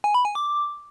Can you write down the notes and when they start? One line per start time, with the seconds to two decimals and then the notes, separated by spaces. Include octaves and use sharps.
0.04 G#5
0.15 B5
0.25 G#5
0.35 D6